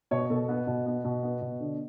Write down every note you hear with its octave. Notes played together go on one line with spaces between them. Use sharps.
B2 C#5
B2 A4
B3
B2
B3
B2
B3
B2
D3